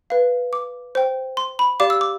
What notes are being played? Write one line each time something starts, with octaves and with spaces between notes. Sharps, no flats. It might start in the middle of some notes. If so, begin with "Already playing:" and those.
B4 F5
D6
C5 G5
C6
B5
G4 D5 F5 D6
E6
D6